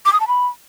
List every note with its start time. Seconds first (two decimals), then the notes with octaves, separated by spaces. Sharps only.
0.05 D6
0.13 D#6
0.20 A5
0.27 B5